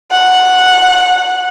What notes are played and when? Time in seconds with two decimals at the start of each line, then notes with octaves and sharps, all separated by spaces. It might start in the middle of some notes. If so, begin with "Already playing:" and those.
0.11 F#5